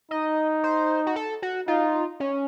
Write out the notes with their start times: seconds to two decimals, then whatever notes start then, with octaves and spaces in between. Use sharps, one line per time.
0.11 D#4 D#5
0.63 C5
1.07 F#4
1.16 A4
1.42 F#4
1.68 D#4 F4
2.20 C#4